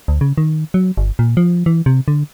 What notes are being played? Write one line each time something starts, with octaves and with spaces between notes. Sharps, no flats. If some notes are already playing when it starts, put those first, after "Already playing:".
D2
C#3
D#3
F#3
G1
A#2
F3
E3
C3
D3